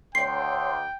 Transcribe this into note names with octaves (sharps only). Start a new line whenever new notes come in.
D2 C#5 G5 C6 C7